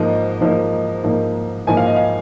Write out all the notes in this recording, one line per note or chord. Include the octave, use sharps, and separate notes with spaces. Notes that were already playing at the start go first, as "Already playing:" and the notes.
Already playing: G#2 F3 A#3 D#4 D#5
G#2 F3 A#3 D#4
G#2 F3 A#3 D#4
G#2 F3 A#3 D#4 G#5
F5
D#5
F5